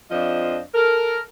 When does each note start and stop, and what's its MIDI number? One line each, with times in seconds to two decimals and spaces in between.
0.11 0.60 41
0.11 0.60 53
0.11 0.60 62
0.11 0.60 72
0.11 0.60 75
0.75 1.20 69
0.75 1.20 70